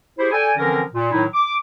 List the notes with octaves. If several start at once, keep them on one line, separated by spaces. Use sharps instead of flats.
E4 G4 G#4 C5
A4 D5 G5 G#5
D3 E3 F3 C4 C#4 A#4
A#2
A2 D#3 F#3 D#4 E4
D6